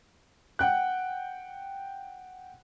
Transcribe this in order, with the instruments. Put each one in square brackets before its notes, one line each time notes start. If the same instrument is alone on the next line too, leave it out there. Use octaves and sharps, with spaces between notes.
[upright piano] F#5 G5 F#6